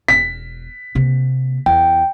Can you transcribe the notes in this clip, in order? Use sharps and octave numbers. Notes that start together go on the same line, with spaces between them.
E1 B6
C3 A#3
E2 G5